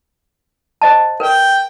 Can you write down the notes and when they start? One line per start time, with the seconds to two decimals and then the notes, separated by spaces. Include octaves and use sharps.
0.82 C5 D#5 A5
1.20 A#4 B4 G5